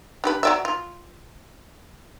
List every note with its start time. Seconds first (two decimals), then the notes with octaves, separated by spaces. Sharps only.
0.24 D4 G4 B4
0.43 F#3 D5 E5
0.65 F4